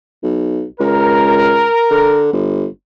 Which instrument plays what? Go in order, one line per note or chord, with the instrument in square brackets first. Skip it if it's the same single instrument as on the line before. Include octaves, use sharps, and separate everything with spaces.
[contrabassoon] B1
[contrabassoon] C#2 [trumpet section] A#4
[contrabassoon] D3
G1